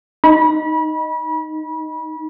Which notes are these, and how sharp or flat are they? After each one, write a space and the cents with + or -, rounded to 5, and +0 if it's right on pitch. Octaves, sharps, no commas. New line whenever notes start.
D#4 +0 B5 -35